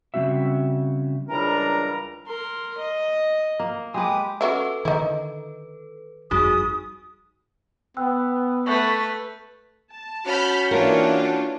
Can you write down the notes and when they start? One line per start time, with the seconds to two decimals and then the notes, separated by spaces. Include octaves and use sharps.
0.14 C#3 G3 C4 F#4 E5
1.29 C#2 E3 G3 D4 A#4 A#5
2.26 A#4 C6
2.78 D#5
3.60 A#3
3.94 G#3 G4 B4 D6 D#6
4.41 C#4 F#4 A4 B4 E5
4.85 D3 D#3 D#4 E4
6.31 G1 F2 G3 D#4 F#4 G#4 D#6
7.97 B3 G5 E6 F#6
8.67 A3 B4 C#6 F#6 G6
9.93 A5
10.26 C#4 F#4 B5 F6 G6
10.71 E3 A#3 D4 F4 A#4 C#5 G5